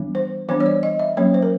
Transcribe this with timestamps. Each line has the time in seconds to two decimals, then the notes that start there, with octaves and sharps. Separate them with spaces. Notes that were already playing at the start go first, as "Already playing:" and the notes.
Already playing: E3 G3 B3 D4
0.15 C5
0.49 E3 G3 B3 D4 C5
0.60 C#5
0.66 D5
0.83 D#5
0.99 E5
1.17 F#3 A#3 C#4 C#5
1.34 C5
1.42 A#4